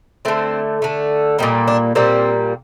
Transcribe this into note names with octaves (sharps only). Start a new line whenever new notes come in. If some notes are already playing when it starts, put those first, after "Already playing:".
D3 A3 C4
D3 A3
A#2 G3 A#3 D#4
D4
A#2 G3 A#3 C4